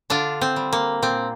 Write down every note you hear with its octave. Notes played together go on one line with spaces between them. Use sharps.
D3 D4 F4
C4
G3
A#3
A#2 C4